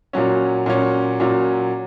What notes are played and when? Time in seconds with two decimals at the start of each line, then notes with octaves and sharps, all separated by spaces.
0.13 A#2 F#3 C#4
0.66 A#2 F#3 C#4
1.20 A#2 F#3 C#4